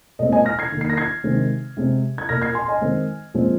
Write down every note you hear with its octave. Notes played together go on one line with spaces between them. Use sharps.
A#2 G#3 C4 D#5
D#5 G#5
F6 A#6
G#6 C7
D#3 A#3
C7
A#6
G#6 C7
C3 D#3 G#3 C4
C3 G#3 C4
G#6
A#2 A#3 F6 A#6
G#6 C7
G#5 C6
D#5 G#5
D#3 G#3 C4
A#2 F3 G#3 C4